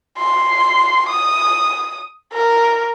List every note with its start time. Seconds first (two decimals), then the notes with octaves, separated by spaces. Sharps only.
0.18 C6
1.09 D#6
2.33 A#4